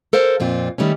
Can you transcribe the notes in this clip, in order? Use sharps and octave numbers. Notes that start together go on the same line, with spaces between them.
A4 A#4 C5 F5
F2 A#2 C4 F4
D#3 G3 A3 C#4